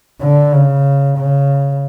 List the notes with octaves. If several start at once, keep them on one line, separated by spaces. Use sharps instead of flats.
D3
C#3
C#3